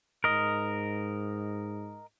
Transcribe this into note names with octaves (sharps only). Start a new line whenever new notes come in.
G#2 A#4 D#5